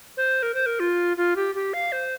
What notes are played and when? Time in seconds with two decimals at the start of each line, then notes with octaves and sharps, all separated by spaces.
0.17 C5
0.43 A#4
0.54 C5
0.66 A#4
0.80 F4
1.17 F4
1.36 G4
1.55 G4
1.74 F5
1.92 C5